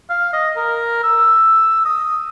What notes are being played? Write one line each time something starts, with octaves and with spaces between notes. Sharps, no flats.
F5
D#5
A#4
E6
D#6